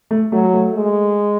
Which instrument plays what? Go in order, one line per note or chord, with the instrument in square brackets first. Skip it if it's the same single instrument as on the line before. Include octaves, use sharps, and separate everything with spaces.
[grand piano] A3
[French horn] F#3 [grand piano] A3
[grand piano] A3
[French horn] G#3